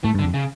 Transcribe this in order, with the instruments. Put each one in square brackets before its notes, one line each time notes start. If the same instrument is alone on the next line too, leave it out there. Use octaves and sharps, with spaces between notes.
[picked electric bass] A2 [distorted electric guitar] A3
[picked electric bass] G2
[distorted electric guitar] D3
[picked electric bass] F2
[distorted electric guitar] C#3